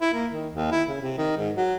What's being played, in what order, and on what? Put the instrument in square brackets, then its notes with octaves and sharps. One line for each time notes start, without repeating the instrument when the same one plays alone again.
[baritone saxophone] E4
A#3
D#3
D#2
E4
C#3
C3
D#3
G#2
F#3